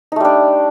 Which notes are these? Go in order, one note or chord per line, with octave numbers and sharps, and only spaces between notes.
G3 A3 D4 D#4